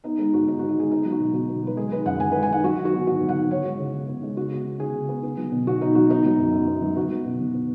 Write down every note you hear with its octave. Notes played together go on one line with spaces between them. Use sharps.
B3 D#4
G#3 D#4
G#2 F#4
G#2 D#4
B3 F#4
D#4
G#3 G#4
B3 D#4
F#3
F#4
B2
B2 F#4
B3
F#3 B4
G#3 G#4
D#3 B4
F#2 F#5
F#2 G#5
G#3 B4
G#5
D#3 F#5
F#3 F#4
D#3
F#4
B3
G#2 F#4
F#3
F#5
D#3
B3 C#5
G#3
C#3
C#3
B3
G#3
C#3 F#4
B3
B3
C#3 G#4
C#3
B3
B3
F#3
B2
B2 F#4
B3 D#4
F#3 F#4
B3 D#4
F#3
F#2
F#2
B3
F#3
B3 F#4
F#3
B2
B2
B3